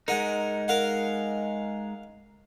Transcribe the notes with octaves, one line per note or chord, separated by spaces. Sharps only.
G#3 D#4 A#4 F#5
A#4 F5 F#5